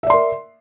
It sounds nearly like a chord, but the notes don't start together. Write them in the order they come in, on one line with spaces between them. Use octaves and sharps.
E5 D5 C6 A#4